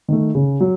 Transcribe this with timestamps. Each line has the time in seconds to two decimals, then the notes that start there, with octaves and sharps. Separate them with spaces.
0.08 D#3 A3
0.35 C#3
0.60 F#3